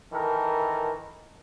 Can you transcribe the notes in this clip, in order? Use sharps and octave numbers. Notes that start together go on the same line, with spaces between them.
D#3 E3 A4 A#4